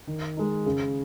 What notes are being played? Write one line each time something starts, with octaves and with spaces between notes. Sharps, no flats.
D#3
G#3 D#4
C#3